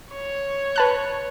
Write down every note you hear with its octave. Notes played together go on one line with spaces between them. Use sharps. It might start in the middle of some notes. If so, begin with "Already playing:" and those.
C#5
B4 A5 F#6